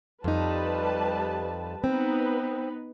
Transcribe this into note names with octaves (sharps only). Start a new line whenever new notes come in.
F2 G3 D#4 B4 A5
B3 C4 D#4 B4